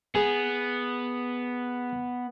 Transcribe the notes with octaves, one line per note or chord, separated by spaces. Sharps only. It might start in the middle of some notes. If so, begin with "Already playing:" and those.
B3 G#4